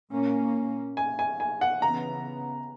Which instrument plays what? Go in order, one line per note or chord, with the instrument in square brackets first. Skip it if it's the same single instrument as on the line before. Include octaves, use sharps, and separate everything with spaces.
[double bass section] A#2 A#3 C#4
[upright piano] G#5
G#5
G#5
F#5
[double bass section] C#3 E3 B3 [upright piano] A#5